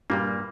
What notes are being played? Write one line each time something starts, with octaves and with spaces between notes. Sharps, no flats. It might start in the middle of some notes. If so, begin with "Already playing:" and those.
G2 A#2 G3 A#3